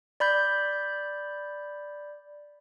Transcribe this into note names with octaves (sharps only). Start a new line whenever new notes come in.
D5 B5 G6